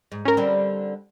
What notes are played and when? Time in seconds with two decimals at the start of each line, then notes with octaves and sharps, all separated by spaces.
0.12 G#2
0.25 C#4 A#4
0.37 D3 G3 C4